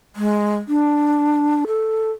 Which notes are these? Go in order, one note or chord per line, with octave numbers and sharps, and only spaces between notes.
G#3
D4
A4